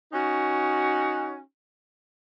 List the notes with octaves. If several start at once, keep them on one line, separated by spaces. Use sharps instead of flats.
C#4 D#4 F#4